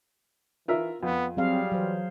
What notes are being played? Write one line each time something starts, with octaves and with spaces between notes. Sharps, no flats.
E3 F4 A#4 E5
F2 B3
F#3 G3 C4 G#4 F5
E3 F#3 C5